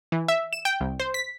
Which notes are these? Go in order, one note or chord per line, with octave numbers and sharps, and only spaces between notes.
E3
E5
E7
G5
C2
C5
B6